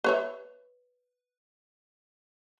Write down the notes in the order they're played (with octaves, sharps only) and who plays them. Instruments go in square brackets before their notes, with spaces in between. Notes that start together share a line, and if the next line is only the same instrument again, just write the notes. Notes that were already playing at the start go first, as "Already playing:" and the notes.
[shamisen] B4 C#5 E5